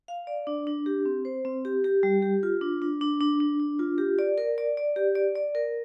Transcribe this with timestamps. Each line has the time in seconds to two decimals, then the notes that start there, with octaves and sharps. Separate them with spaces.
0.08 F5
0.27 D5
0.47 D4
0.67 D4
0.86 G4
1.05 C4
1.25 C5
1.45 C4
1.65 G4
1.84 G4
2.03 G3
2.22 G4
2.43 F4
2.61 D4
2.82 D4
3.01 D4
3.21 D4
3.40 D4
3.60 D4
3.79 F4
3.98 G4
4.19 D5
4.38 A#4
4.58 D5
4.77 D5
4.96 G4
5.15 D5
5.35 D5
5.55 A#4